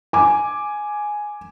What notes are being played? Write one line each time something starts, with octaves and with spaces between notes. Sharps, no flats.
G#5 D6